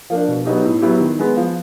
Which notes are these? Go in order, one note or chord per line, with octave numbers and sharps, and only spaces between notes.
F3 A#3 D4
B2
F#3 B3 D#4 G4
A2
F#3 B3 E4 G4
D#3
G#3 B3
F3